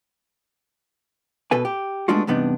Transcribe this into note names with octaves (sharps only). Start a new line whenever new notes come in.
B2 A4 B4 G#5
G4
G#3 A3 B3 D4 F4 F#4
E2 G2 C3 B3 D4 D#4